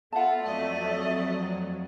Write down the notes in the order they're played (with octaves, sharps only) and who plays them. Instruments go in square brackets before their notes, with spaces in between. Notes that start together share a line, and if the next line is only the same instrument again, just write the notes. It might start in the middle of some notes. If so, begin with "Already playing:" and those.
[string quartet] B3 F4 [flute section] A4 E5 [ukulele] F#5 A5
[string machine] F2 F#3 [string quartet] A3 D5 D#5